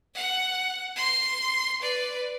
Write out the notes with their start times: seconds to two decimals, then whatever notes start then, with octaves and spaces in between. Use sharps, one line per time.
0.15 F#5
0.96 C6
1.81 B4 D5